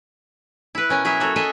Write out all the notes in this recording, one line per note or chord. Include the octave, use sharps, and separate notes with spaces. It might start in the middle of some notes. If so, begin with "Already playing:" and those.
E4 B4
B2 C#4 A#4 G#5
F#3 E4 G#4 E5
A#3 F#4 A4 C#5
G#4 A4 D#5 E5 G#5 A5